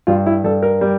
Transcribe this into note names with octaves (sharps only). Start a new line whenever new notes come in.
G2 F4
E4
G2 A4
A#4
G3